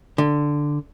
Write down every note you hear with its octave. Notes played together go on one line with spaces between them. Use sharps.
D3